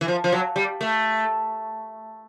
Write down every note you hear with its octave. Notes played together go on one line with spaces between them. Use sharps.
E3
F3
F3
F#3
G3
A3